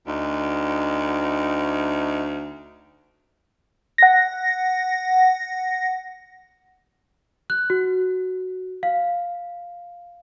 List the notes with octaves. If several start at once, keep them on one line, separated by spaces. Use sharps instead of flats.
D2 D#4
F#5 A#6
F#6
F#4
F5